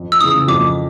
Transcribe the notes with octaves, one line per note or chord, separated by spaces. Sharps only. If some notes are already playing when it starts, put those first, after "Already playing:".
Already playing: F2
E6
C#3 E3 D#6
F2 D6